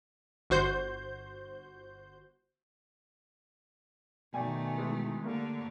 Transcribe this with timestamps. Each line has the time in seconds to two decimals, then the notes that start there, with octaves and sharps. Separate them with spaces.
0.50 G1 F#4 C5 G6
4.34 B2 D#3 A3 D5 G5 G#5
4.78 E3 G#3 G#4
5.25 D3 A3 A#3 G4